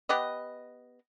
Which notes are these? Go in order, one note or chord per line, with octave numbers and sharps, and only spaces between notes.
B3 G4 B4 D#5